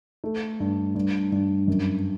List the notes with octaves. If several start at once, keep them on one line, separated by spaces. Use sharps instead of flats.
A3
G2
G2
G2
F#2